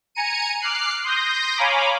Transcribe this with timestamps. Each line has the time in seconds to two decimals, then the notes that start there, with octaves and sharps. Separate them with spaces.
0.15 G#5 A#5 C#7 D#7
0.61 D6 F6 F#6 C7
1.04 C6 D#6 G6 A#6
1.57 C#5 F5 G#5 A#5 B5 D6